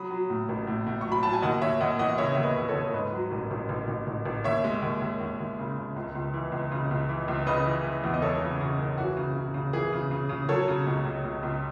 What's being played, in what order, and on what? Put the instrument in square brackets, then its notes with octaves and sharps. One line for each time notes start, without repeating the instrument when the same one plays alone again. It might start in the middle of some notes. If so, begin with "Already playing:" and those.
Already playing: [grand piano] F#3 B5 D#6
F#3
A2
A1
A2
A2
F#3 C#6
B5
F#3 A5
G#5
D#2 D#5 F#5
D#2 C#5 E5
D#2 D#5 F#5
E3 D#5 F#5
C#3 C#5 E5
D#2 E5
B4 D#5
D#2
A4 C#5
D#2
C#5
G#2 B4 D#5
F#3
A1
A1
A1
A1
A1
A1
D#2 C#5 E5
G#3
D#2
D#2
D#2
D#2
C#3
C#3
C#2
C#2
E3
C#2
C#3
C#2
E3
C#2
C#3 B4 D#5
E3
E3
E2
D#5
E3 A4 C#5
C#3
C#3
F#1
E3 F#4
C#3
C#3
C#3
E3 G#4
C#3
C#3
C#3
F#3 A4 C#5
C#3
C#2
C#2
C#2
C#2